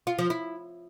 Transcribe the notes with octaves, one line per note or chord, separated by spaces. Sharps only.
F4
F3
E4